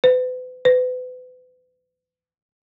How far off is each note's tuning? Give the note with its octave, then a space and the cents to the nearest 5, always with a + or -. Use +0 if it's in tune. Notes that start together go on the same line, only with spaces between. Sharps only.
B4 +40
B4 +35